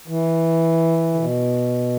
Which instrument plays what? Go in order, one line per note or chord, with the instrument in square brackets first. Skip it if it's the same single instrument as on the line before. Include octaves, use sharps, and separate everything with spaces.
[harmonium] E3
D3
B2